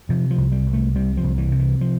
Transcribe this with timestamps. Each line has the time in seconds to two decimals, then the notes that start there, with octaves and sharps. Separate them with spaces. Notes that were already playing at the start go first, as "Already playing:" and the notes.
0.09 C3 F3
0.30 F3
0.38 C2
0.52 G3
0.67 C2
0.73 A3
0.95 C3 G3
1.17 F3
1.24 C2
1.38 E3
1.52 C3
1.59 E3
1.81 F3